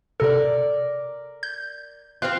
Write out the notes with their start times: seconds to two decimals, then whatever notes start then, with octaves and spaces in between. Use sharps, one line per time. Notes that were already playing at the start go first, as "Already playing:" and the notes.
0.20 C3 A4 A#4 D5
1.43 G6
2.22 F3 C4 F4 F#6